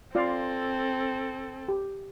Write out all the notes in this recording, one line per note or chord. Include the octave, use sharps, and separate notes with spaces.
C4 F4 A4 D5 F5
G4